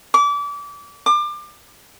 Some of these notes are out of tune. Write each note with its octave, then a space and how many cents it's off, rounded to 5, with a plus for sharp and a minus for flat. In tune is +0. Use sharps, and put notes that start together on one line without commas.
D6 -30
D6 +30